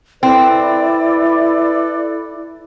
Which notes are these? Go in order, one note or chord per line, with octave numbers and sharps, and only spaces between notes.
C4 E4 A4 B4 D5